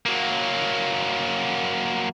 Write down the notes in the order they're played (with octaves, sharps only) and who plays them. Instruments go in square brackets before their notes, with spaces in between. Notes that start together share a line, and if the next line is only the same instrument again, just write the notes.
[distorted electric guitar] F#3 A#3